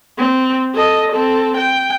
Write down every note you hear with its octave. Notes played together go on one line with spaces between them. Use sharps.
C4
A4 D#5
C4 A4
G5